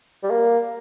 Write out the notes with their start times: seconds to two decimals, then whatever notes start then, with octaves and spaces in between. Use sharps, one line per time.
0.23 G3
0.31 A#3